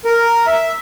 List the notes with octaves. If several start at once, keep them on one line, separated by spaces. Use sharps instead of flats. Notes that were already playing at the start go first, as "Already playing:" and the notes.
A#4
E5